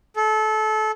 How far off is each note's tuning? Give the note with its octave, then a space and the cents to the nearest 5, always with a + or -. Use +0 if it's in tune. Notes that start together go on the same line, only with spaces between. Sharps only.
A4 -25